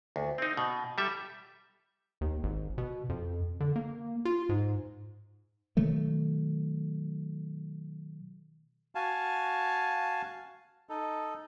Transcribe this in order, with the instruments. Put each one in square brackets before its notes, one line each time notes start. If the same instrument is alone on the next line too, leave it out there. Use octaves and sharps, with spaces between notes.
[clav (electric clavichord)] D2
C4 D#4
B2
G3 A4 E5
[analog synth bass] D#2
G#1
B2
F2
D3
A#3
F4
G#2
[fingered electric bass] B2 D#3 F#3 A3
[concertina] F#4 F5 G#5 A5
D#4 A4